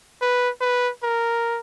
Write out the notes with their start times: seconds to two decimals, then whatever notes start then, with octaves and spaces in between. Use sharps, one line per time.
0.21 B4
0.61 B4
1.03 A#4